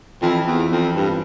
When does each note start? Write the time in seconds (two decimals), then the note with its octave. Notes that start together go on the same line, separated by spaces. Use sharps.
0.22 F2 E3
0.47 E2
0.71 F2
0.96 G2